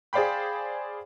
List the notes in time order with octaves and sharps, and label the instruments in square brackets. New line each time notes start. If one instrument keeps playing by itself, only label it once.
[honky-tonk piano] G#4 C5 D5 F5 G5 B5